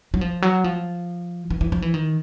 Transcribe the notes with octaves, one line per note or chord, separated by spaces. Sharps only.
F#3
F3
F#3
F3
E3
E3
F3
E3
D#3